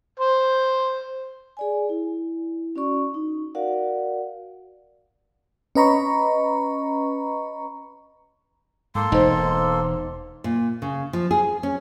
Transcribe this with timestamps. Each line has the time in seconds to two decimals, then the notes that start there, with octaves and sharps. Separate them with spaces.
0.20 C5
1.57 G#4 D5 G#5
1.89 E4
2.76 C#4 F#4 D5 C#6
3.14 D#4
3.55 F#4 A#4 D5 F5 F#5
5.75 C#4 B4 D#5 A#5 B5 C#6
8.95 G#2 A#3 A4 C6
9.12 E1 D#4 C5
10.44 A#2
10.82 C#3
11.13 F3
11.31 G#4
11.63 C#4